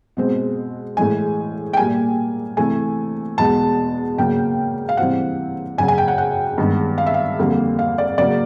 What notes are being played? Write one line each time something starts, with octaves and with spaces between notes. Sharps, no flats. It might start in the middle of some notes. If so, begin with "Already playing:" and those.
B2 G#3 C4
A2 E3 G#3 G#5
G5
A#2 G3 A#3 G#5
C3 E3 A3 G#5
E2 B2 G#3 B3 A5
C#3 F#3 A#3 G5
F5
C3 E3 G3 C4 F#5
F#2 C#3 F#3 G#5
G#5
G5
F#5
F#5
G2 D#3 G#3 B3
F5
E5
F5
F2 D3 G3 A#3
F5
D5
C#3 F#3 A#3 D5